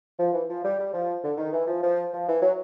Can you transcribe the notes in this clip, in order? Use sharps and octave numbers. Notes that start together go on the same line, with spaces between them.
F3
E3
F3
G3
G3
F3
D3
D#3
E3
F3
F3
F3
E3
F#3